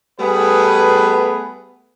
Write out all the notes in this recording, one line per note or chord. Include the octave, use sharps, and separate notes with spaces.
G3 A3 B3 G#4 B4